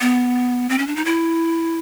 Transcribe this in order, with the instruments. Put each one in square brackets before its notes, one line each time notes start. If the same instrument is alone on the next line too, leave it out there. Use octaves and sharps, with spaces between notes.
[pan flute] B3
C4
C#4
D4
D#4
E4